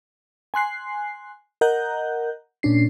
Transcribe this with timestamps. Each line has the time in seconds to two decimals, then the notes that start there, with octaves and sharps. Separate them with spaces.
0.54 G#5 C6 F#6 C7
1.61 A#4 D#5 F#5 A#5 F#6 G6
2.63 A#2 C#4 D4 C7